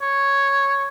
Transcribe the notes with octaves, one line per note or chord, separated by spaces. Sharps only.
C#5